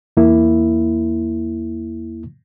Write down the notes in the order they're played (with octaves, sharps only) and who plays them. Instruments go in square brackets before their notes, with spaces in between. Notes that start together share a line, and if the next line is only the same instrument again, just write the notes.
[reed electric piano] E2 A#3 E4